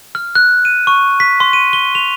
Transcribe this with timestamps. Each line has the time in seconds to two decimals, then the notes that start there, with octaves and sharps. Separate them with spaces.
0.15 F6
0.35 F#6
0.65 D#7
0.87 C#6
1.20 B6
1.40 C6
1.53 D#7
1.73 G7
1.95 F7